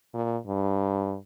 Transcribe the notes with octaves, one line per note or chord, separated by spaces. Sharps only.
A#2
G2